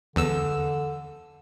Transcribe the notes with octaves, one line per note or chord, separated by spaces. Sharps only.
E2 D3 E6